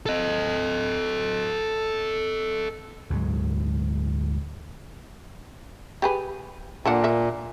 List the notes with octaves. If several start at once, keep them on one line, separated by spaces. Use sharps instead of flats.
A4 D#5
D2 G#2 F#3 G#3
G4 G#4 B4
A#2 D3 D4 F#5
A#4 E5 F#5